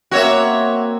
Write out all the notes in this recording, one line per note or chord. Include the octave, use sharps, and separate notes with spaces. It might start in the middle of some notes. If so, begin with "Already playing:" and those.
A#3 C4 F#4 C#5 E5